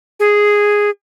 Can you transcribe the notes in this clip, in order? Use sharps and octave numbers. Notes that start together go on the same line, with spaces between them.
G#4